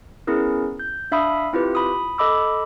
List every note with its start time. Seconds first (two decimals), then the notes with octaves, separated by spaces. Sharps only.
0.27 B3 C#4 E4 G#4 A#4
0.80 G6
1.12 D4 E5 F5 B5 D#6
1.53 C4 E4 F4 G4 B4
1.75 B5 D#6
2.18 A4 D#5 B5 D6 E6